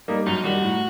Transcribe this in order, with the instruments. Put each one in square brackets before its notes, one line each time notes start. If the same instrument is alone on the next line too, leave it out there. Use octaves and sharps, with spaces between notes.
[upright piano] G3 A#3 D#4
[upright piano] F#2 [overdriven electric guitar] D#4
[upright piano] D#3 G3 [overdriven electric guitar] F#4
[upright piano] A2